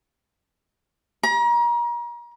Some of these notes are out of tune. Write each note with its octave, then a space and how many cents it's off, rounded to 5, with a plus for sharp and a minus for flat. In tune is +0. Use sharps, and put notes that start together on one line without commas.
A#5 +35